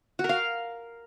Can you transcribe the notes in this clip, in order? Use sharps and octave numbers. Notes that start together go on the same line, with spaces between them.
F#4
A#4
F5